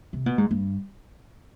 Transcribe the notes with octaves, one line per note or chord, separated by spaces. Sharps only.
C3
B2
G#2
G2